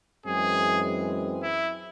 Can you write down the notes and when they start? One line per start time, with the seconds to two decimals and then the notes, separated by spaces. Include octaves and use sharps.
0.24 F#2 E3 G#3 C4 G#4
1.41 E4